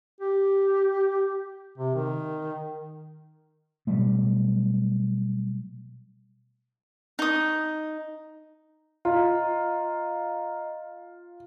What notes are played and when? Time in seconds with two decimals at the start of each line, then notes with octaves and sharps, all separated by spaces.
0.21 G4
1.78 C3
1.95 D#3
3.87 B2 F#3 G3 A3
7.19 D#4 D#6
9.05 F4 D#5 A#5